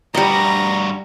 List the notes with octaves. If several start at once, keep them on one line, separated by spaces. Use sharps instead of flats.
G2 G3 F#4 D#5 A#5